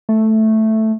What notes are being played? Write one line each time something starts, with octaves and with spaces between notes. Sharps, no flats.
A3